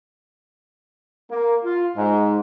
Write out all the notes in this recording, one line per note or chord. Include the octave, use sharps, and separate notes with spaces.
A#3
F4
G#2